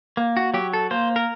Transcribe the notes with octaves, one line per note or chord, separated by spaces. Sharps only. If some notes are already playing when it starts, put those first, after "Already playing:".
A#3
F#4
F#3 G4
A4
A#3 C5
A#4